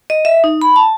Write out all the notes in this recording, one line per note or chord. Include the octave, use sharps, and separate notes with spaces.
D#5
E5
D#4
B5
A5